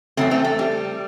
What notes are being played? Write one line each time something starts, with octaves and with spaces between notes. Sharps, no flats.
E2 D#3 F#3 A3 C4
A3 C4
A3
G3